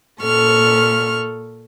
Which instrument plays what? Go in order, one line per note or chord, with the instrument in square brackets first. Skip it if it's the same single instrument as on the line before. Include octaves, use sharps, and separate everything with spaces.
[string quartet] A#2 A4 C#6 F6